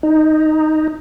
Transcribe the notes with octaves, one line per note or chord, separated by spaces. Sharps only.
D#4